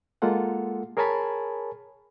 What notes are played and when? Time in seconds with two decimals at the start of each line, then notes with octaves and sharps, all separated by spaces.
0.22 G#3 A#3 F4 A4 F#5
0.97 G#4 A#4 C#5 G#5 A5 B5